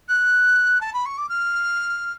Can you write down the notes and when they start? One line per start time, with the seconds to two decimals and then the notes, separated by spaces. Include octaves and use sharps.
0.08 F#6
0.81 A5
0.93 B5
1.05 C#6
1.18 D6
1.29 F6